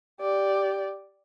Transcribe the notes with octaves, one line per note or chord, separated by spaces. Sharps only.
G4 D5